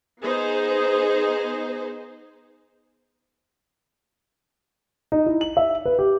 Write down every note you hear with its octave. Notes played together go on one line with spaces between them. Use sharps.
B3 D#4 G#4 C5
D#4
E4
F#7
E5
B4
G4